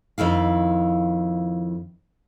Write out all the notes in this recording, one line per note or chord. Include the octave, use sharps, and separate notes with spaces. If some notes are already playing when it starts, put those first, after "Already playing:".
F2 D#3 E4 F5